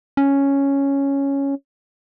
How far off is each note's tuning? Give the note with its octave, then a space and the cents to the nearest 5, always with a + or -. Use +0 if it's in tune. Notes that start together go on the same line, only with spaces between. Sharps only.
C#4 +0